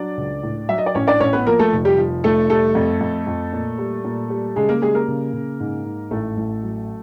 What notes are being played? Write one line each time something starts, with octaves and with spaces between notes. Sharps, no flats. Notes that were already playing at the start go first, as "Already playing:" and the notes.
Already playing: F#3 D4 D5
C#2
A2
F#3 E5
D#5
D5
A1 C#4 C#5
D4 D5
A1 C#4 C#5
B3 B4
F3 A#3 A#4
A3 A4
F1
G3 G4
F3
F1 A3 A4
G3 A3 A4
F2
F2
F2
A#2
G3
A#2
G3
C#3 G#3 G#4
A#3 A#4
G3 G#3 G#4
A#3 A#4
C#3
C#3
G#2
G#2
A1 A3 A4
A1
F#3